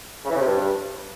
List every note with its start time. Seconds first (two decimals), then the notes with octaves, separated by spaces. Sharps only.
0.24 C#3
0.30 E3
0.35 C#3
0.41 C3
0.46 G2